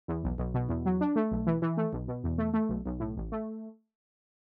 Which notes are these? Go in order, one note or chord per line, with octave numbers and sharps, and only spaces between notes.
E2
B1
B1
B2
E2
F#3
D4
A3
B1
E3
E3
A3
B1
B2
E2
A3
A3
B1
B1
A2
A1
A3